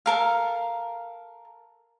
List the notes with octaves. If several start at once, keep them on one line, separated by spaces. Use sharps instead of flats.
A4 A#4 F5